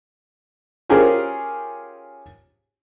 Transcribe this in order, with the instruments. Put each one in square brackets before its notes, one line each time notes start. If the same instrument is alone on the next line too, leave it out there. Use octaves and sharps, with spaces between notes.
[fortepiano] C#4 F4 G4 G#4 A#4 C5